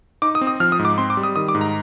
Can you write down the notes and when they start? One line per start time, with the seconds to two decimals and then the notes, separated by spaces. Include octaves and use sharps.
0.22 D#4 D6
0.35 D#6
0.41 C4
0.47 D#6
0.60 F3 F6
0.72 D#6
0.79 G#2
0.85 D6
0.98 C4 C6
1.10 D6
1.17 G3
1.23 D#6
1.36 D#3 D#6
1.48 D6
1.55 G#2
1.61 A#5